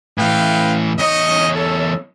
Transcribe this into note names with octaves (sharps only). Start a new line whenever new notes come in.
A2 E3 B4 F5 G5
E2 D#4 C#5 D#5
A4